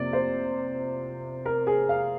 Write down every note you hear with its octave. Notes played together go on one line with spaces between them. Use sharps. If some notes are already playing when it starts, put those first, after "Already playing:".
Already playing: F2 C3 F3 A#3 D5
C5
A#4
G#4
F5